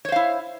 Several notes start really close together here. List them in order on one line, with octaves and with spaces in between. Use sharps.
C#5 C5 F5 E4